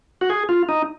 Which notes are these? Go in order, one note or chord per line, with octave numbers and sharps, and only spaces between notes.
F#4
G#4
F4
D#4